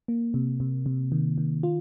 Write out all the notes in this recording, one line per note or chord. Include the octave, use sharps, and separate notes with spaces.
A#3
C3
C3
C3
D#3
D#3
F4